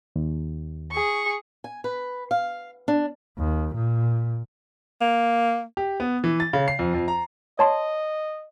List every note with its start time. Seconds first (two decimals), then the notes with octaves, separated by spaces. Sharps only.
0.16 D#2
0.92 G#4 C#6
1.64 G#5
1.84 B4
2.31 F5
2.88 D4
3.38 D#2
3.74 A#2
5.01 A#3
5.77 G4
6.00 B3
6.24 E3
6.40 A6
6.53 C#3
6.68 C7
6.79 F2
6.94 F2
7.08 A#5
7.59 C#5 D#5 A5 C6